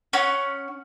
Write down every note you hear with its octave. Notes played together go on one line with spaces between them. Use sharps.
C#4 F#5